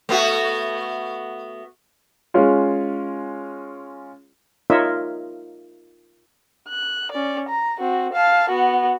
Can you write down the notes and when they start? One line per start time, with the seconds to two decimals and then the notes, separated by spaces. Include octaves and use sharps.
0.09 A3 B3 F#4
2.34 G#3 C#4 F4
4.70 D#4 F4 A#4 C#5 D#5 E5
6.68 F#6
7.12 C#4 D5
7.49 A#5
7.80 C4 F#4
8.13 F5 A5
8.50 B3 F#4